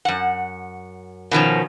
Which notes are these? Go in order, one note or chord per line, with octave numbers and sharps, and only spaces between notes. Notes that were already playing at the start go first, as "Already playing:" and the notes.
F#2 F#5
B2 D#3 F3 C#4